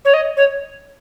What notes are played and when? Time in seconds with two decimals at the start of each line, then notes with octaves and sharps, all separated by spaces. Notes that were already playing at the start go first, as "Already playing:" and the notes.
0.05 C#5
0.13 D#5
0.37 C#5